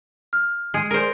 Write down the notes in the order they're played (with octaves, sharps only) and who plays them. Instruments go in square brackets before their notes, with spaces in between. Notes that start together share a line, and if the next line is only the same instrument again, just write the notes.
[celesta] F6
[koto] G#3 G#4
[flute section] G#4 D5 [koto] A#4 C5